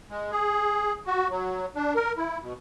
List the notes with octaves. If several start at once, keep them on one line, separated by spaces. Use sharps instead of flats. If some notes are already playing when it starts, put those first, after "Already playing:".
G#3
G#4
F#4
F#3
D4
A#4
E4
B2